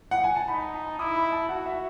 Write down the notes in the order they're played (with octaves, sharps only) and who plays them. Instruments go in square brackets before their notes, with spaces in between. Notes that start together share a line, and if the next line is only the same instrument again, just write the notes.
[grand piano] F#5
G#5
A5
[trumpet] D#4 [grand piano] B5
[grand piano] A5
[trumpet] E4 [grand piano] D#6
[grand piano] B5
A5
[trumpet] F#4 [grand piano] F#5
[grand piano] E5